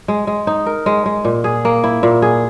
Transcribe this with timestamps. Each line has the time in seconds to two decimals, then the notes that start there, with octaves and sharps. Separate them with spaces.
0.08 G#3
0.27 G#3
0.47 D#4
0.66 A#4
0.86 G#3
1.06 G#3
1.25 A#2
1.44 G#4
1.65 A#3
1.84 E4
2.03 A#2
2.22 G#4